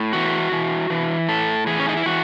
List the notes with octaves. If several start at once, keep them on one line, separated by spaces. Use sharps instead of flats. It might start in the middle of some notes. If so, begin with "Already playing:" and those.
Already playing: A2
E3 F#4
E3
E3
A2 A4
E3 G#4
C#4
D#4
E4
E3 F#4